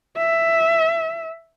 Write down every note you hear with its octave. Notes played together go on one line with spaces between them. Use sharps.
E5